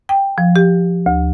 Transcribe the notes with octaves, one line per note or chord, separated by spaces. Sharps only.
G5
F3
G4
D2